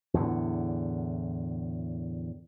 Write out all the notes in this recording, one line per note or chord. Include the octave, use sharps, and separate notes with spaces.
E2 A2 D3